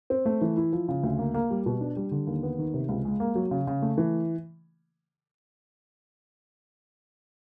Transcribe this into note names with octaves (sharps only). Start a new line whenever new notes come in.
C4
A3
E3
E4
F3
C#3
D2
A#3
A#3
G3
B2
D4
G3
D3
D#2
B3
D#3
C3
C#2
G#3
A#3
F#3
C#3
C#3
A3
E3